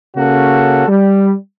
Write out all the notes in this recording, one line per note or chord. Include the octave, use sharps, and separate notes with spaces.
C#3 A#3 C#4 F#4 A4
G3